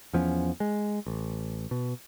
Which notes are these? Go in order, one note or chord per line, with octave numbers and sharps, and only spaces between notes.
E2 F3 B3 C#4
G#3
A1
B2